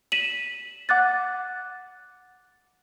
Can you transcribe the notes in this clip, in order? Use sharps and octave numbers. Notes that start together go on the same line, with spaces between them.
B6 D#7 E7 F#7
F#5 D6 F#6 A6